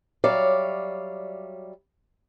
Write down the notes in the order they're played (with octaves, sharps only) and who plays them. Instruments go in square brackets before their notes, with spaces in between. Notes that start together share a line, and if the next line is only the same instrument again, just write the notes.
[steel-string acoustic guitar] F#3 G3 C#5 D5 E5 F5